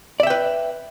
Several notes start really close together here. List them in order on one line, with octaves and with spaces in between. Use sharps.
D5 E5 G5 B4